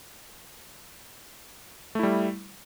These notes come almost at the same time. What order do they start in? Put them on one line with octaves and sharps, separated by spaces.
A3 E4 G3